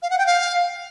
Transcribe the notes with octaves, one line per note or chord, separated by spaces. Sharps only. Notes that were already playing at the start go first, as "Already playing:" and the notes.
F5
F#5
G5
F5